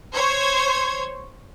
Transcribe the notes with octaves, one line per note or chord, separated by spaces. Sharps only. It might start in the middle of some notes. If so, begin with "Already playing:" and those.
C5 C#5 G#6